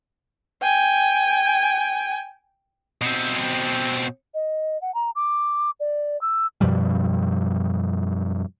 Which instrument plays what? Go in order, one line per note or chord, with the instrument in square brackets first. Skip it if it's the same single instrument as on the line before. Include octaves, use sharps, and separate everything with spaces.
[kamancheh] G5 G#5
[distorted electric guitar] B2 C4
[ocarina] D#5
F#5
A#5
D6
D5
E6
[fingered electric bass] F#2 B2 F3 G3